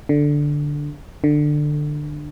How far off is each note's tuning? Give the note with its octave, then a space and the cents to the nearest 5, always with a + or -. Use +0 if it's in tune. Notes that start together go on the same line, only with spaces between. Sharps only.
D3 +0
D3 +20